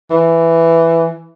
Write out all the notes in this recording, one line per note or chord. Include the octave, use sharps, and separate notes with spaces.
E3